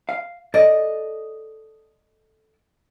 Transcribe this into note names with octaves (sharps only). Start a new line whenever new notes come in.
F5
A4 D5 D#5